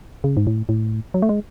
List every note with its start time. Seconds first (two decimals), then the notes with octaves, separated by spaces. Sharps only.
0.24 C#3
0.37 G#2
0.47 A2
0.69 A2
1.14 F#3
1.22 A3
1.29 G#3